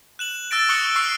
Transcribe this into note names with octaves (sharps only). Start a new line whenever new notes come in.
F#6 E7 F#7
E6 F#6 A6 A#6 D7
C#6 D#6 F#6 C#7 G7
C#6 E6 F6 C7 D7